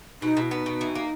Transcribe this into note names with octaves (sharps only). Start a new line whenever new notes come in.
B2 D#4
B2
E4
B3 D#4
B2
E3
A#3